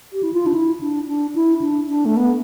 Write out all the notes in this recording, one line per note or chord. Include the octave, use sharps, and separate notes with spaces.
G4
E4
F4
D4
E4
D4
D4
E4
D4
D4
A3
B3